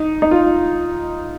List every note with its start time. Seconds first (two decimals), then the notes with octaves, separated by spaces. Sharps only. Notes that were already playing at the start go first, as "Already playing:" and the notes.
Already playing: D#4
0.22 D#4
0.31 F4